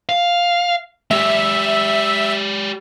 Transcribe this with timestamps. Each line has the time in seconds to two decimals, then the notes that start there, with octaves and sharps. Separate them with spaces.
0.09 F5
1.11 G#3 G4 E5